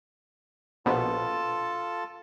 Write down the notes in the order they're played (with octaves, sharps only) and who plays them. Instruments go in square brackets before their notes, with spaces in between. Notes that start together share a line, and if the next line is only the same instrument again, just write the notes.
[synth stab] A#1 B2 [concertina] F4 A4 A5